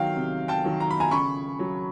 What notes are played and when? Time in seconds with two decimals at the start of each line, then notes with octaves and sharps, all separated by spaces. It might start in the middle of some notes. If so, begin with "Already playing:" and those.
Already playing: D#3 F#3 F5 G5
0.17 C3
0.48 G5 A5
0.64 D#3 F#3
0.80 A#5
0.91 B5
1.00 G#5 A#5
1.11 C#3 B5 C#6
1.59 F#3